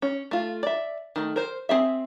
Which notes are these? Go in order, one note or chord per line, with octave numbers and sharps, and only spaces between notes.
C#4
A3 F4
D5 E5
D#3 A3
A#4 C5
C4 G#4 E5